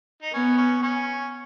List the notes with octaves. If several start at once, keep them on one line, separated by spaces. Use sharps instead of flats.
D#4
B3 C#4
C#4
C#4